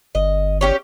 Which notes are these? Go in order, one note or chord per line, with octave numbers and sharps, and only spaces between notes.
G1 D#5
C#4 G4 C#5